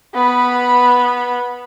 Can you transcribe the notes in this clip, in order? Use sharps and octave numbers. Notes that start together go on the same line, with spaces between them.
B3 B5